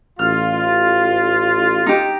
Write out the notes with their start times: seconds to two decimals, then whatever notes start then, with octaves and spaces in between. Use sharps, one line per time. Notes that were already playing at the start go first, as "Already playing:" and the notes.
0.19 A1 F4 F6
1.86 D#4 G4